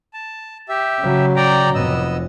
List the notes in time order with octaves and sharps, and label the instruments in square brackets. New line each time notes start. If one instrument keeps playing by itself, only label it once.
[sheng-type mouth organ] A5
G4 E5
[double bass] C#3 F#3
[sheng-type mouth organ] D5 G5 A#5
[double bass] F1 [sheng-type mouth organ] B3 D#5 E6